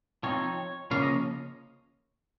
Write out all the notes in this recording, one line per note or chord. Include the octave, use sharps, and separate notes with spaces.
F3 C4 D#4 C#5
C#3 F3 A#3 C#4 F5
D#5